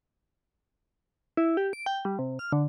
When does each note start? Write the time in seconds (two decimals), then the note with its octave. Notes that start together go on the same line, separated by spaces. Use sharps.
1.37 E4
1.57 G4
1.73 D7
1.86 G5
2.05 G3
2.19 C3
2.39 F6
2.52 D3